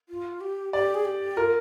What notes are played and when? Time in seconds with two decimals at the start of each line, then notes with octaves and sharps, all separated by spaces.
0.09 F4
0.41 G4
0.73 G4 D5
0.94 G#4
1.05 G4
1.37 F4 A#4